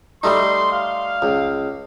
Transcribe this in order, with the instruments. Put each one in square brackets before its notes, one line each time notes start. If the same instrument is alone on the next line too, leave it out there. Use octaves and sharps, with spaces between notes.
[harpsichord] G3 A3 D#4 [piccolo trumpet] C6
[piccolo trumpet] F5
[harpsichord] C#2